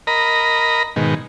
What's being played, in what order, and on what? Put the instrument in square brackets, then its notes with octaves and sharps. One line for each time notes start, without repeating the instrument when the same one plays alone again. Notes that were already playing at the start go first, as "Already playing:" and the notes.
[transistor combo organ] A#4 D#5 A#5 B5
G#2 B2 D#3